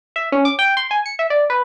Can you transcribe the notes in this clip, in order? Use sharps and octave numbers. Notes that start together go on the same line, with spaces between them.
E5
C#4
D6
G5
C6
G#5
C#7
E5
D5
B4